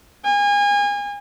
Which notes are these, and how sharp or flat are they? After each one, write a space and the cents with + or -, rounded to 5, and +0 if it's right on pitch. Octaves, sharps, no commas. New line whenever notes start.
G#5 -30